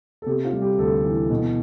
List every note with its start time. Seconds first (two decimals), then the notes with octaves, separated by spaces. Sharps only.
0.22 A4
0.26 C3 G4
0.45 F4
0.53 G3
0.62 G4
0.78 D2 A4
1.05 E3
1.30 B2